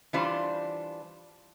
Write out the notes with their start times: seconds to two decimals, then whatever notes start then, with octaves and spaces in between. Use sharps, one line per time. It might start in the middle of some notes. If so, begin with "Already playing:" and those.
0.13 E3 G3 D4 F4 C5